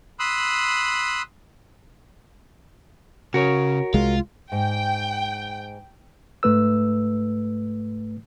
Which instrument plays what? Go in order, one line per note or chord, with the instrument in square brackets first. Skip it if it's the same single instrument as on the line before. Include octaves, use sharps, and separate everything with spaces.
[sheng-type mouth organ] B5 C6 D#6 E6 F#6
[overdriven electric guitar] C#3 [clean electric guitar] F#4 A#4 C#5
[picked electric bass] C2 G#3 [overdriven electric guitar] F4
[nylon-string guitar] G#2 [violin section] G5
[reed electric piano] G#2 A3 B4 E6